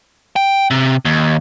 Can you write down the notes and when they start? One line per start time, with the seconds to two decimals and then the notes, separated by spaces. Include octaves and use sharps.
0.36 G5
0.71 C3
1.05 D#2